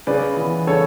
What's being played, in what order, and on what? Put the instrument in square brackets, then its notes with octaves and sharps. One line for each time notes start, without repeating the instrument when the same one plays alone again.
[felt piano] C#3 [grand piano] B4 D5
[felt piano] E3 B3
[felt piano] C#3 [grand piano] A4 C#5